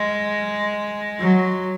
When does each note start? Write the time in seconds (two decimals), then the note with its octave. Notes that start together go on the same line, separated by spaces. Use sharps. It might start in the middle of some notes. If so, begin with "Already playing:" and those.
Already playing: G#3
1.19 F#3